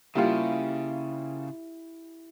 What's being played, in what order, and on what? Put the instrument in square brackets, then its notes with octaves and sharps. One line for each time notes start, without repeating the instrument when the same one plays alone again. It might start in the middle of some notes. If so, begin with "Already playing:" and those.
[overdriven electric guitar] C#3 [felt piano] G3 A#3 F4 [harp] E4 G4